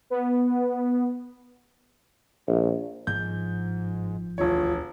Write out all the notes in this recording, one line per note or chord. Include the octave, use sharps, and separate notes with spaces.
B3
A#1
G1 G#2 F3 G6
E1 D2 F4 C#5